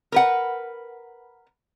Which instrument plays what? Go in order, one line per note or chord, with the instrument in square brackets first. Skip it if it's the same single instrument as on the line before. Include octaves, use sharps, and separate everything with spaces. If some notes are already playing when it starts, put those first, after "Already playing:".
[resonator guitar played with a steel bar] A#4 B4 F#5